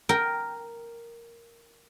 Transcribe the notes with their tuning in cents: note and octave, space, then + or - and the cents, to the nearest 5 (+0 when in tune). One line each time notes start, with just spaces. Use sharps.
A#4 +0 G5 +0